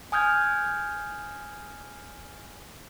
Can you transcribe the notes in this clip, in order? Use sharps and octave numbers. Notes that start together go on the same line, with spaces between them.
G#5 D#6 F6 G6 G#6